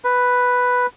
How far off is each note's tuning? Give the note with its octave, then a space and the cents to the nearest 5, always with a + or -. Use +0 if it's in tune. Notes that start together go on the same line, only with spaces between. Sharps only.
B4 +0